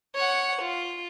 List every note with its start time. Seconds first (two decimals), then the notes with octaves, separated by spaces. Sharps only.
0.16 C#5 F#5
0.62 F4